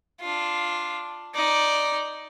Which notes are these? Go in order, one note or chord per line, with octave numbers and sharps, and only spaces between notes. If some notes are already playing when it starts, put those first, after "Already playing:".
D4 F4
D#4 D5